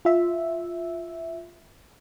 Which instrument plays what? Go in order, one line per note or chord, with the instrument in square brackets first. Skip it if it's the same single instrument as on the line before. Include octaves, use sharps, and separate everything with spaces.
[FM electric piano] F4 E5